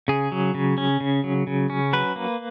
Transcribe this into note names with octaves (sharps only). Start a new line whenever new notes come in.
C#3 G#4
F#3
C#3
C#4
C#3
F#3
C#3
C#4
F#3 B4
A#3